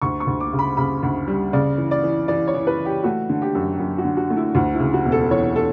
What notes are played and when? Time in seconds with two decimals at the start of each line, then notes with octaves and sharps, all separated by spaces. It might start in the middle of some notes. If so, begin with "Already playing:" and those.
0.02 D2 C#6
0.20 C#6
0.27 D2
0.40 D6
0.53 C#3
0.59 B5
0.77 C#3 B5
1.03 D2
1.28 G3
1.53 C#3 D5
1.78 E3
1.91 D5
2.03 E3
2.28 E3 D5
2.47 C#5
2.54 E3
2.67 B4
2.78 E3
2.85 G4
3.04 A3 F#4
3.29 D3
3.42 G4
3.55 F#2
3.79 F#2
3.98 F#4
4.04 D3
4.17 F#4
4.30 A3
4.37 E4
4.55 D2 F#4
4.74 E4
4.80 C#3
4.94 F#4
5.05 E1
5.12 A4
5.31 E3 C#5
5.56 A4